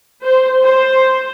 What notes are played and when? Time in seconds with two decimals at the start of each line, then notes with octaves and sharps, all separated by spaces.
0.23 C5
0.64 C5